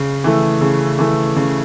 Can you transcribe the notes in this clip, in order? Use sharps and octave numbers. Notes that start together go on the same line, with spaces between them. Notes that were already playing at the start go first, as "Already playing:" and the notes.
Already playing: C#3
E3 A3
C#3
E3 A3
C#3